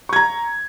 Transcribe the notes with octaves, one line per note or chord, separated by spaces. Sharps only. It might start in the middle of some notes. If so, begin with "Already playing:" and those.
A#5 C#6 G#6